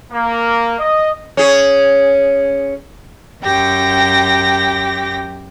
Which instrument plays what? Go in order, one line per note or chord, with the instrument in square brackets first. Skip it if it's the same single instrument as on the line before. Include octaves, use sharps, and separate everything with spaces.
[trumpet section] A#3
D#5
[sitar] C#4 G#4
[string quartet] F#2 G4 G5 A#6